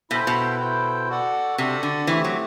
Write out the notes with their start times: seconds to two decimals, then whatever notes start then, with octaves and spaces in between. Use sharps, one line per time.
0.10 B2 E4 A4 C5 G5
0.27 B2
0.60 E4 A4 C5 G5
1.09 F#4 A4 D5 F#5
1.58 C3 F#4 A4 D5 F#5
1.83 D3
2.07 E3 A3 C4 G4
2.24 F#3